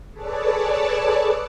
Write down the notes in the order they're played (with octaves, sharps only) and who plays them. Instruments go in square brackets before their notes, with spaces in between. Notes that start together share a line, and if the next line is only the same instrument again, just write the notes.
[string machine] G#4 A4 B4 C#5 D5 A5